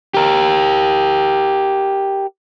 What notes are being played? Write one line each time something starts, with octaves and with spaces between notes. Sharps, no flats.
G4 A#4